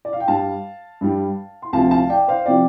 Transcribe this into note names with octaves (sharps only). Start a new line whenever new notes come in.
D5
F5
G5
G2 G3 F5 A5
G2 G3
C6
D2 C3 F3 F5 A5
F5 A5
D5 G5
C5 F5
C3 F3 D5 G5